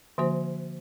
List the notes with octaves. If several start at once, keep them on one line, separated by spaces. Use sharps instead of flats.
D3 F3 A#3 F#4 C5